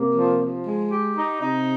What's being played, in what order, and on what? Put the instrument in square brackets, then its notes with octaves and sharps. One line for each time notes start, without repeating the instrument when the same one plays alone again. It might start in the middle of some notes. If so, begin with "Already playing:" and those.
Already playing: [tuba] C3 [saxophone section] A#3
[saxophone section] F3
F3
G#3
G4
D#4
[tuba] C3 [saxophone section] D#4